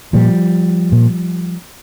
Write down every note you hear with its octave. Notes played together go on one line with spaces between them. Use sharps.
A#2 F3 G3
A#2